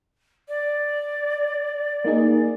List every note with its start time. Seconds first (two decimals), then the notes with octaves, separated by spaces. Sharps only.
0.48 D5
2.05 A#3 D#4 G#4